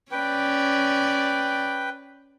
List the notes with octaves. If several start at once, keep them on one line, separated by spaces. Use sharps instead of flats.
C#4 B4 D5 G5